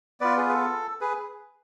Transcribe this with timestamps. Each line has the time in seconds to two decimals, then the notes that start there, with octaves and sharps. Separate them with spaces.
0.21 B3 F4 B4 D5
0.37 G#4 B4
0.49 B4
0.53 A4
1.01 G#4 B4